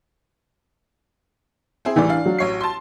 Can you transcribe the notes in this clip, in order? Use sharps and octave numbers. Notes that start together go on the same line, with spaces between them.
C4 E4 G#4
C2 A2 E3 D5
D4 F5
F#3
A1 C#5 C7
A5 C6